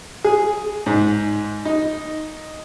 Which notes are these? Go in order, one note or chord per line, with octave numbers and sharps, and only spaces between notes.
G#4
G#2
D#4